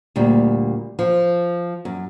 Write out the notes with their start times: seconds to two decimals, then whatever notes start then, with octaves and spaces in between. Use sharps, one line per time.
0.16 D2 A#2 G3
0.99 F3
1.85 F#2